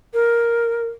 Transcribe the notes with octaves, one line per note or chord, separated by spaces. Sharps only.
A#4